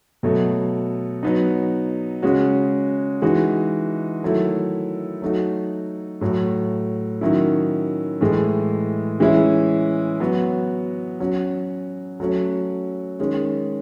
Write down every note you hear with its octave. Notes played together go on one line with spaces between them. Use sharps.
B2 F#3 A3
F#3 B3 D#4
C#3 G#3 C#4 F#4
E3 G#3 D#4 F#4
D#3 F#3 A3 E4
F#3 A3 D#4 F#4
A2 F#3 A3
D#3 F#3 C#4 E4
A2 E3 G#3
E3 G#3 C#4 E4
F#3 B3 F#4
F#3 C#4 F#4
F#3 A3 C#4 F#4
D#3 G#3 C#4